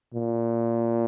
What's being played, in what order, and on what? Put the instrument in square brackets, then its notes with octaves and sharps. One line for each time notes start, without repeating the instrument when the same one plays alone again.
[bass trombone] A#2